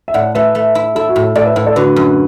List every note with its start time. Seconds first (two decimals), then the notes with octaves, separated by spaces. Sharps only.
0.08 E5
0.14 A2 D5 F#5
0.35 A3 B4 E5
0.55 A3
0.75 E4
0.95 E4 A4
1.09 F#4
1.16 A2
1.22 A4
1.35 A2 A4 D5
1.46 B4 E5
1.56 A2 B4 E5
1.66 A4 D5
1.76 D3 F#4 B4
1.96 F#2